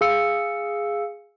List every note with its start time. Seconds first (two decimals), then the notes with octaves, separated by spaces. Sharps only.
0.01 G#4 F5 E6 C#7